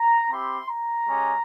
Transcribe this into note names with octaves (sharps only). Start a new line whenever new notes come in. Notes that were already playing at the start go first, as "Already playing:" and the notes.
Already playing: A#5
C4 E4 G4 C6
A#5
G#3 C#4 G4